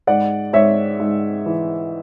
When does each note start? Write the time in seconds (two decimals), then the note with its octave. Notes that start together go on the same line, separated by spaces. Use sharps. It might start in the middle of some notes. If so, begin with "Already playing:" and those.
0.07 G#2 D5 F#5
0.53 G#2 C#5 E5
1.00 G#2
1.46 E3